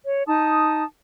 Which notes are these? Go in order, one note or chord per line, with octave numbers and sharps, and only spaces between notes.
C#5
D#4 A5 D#6